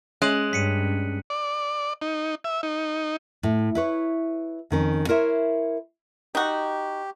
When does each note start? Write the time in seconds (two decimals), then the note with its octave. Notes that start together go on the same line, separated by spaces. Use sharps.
0.22 G#3 C#4 F#6 D#7 F#7
0.53 G2 B6 C#7 D#7
1.30 D5
2.02 D#4
2.44 E5
2.63 D#4
3.43 A2
3.75 E4 B4 C#5
4.70 F2 D#3 C#4
5.08 E4 A#4 C5 C#5 E5
6.35 D#4 F#4 G4